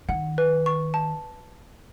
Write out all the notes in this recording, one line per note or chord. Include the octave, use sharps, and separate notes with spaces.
D#3 F#5
B4
C#6
A5